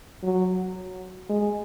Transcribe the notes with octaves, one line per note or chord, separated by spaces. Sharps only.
F#3
G#3